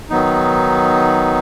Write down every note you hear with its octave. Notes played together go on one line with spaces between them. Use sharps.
D#3 F#3 B3 D#4